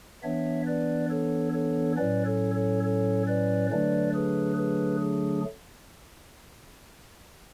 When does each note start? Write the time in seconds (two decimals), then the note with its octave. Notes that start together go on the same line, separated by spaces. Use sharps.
0.23 E3 B3 D4 C#5 E5
0.67 B4 D5
1.10 A4 C#5
1.53 A4 C#5
1.97 A2 F#3 C#4 B4 D5
2.26 A4 C#5
2.55 A4 C#5
2.84 A4 C#5
3.27 B4 D5
3.71 D3 F#3 A3 D4 B4 D5
4.14 G#4 B4
4.57 G#4 B4
5.01 G#4